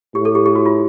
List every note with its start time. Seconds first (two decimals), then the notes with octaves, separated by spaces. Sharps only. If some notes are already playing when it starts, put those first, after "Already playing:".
0.15 A2 G4
0.25 A4
0.35 G4
0.46 G4
0.55 F#4
0.66 F4